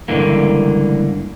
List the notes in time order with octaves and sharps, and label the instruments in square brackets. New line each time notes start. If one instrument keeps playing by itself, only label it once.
[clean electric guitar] C#2 G2 D3 E3 A#3